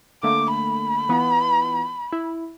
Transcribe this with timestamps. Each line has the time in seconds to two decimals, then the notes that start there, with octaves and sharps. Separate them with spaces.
0.23 D3 A3 A#3 D6
0.55 B5
1.09 E3 B3 F4
2.13 E4